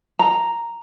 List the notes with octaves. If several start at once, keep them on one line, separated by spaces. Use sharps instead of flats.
A#5